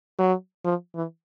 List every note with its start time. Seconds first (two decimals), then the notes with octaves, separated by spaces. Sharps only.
0.19 F#3
0.64 F3
0.95 E3